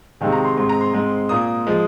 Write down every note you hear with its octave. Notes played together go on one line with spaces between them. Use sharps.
C3 D#3 G#3 C4 F5
A#5
C6
G#2 G#3 C4 C6
A#5
C6
G#2 G#3 C4
A#2 A#3 D#6
F3 G#3